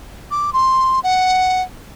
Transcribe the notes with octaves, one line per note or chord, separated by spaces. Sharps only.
D6
C6
F#5